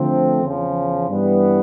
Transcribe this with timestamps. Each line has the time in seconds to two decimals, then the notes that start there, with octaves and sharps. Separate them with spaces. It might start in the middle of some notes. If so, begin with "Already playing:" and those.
Already playing: D3 F3 A3 C4
0.44 E2 C#3 F3
1.09 G2 E3 G3 B3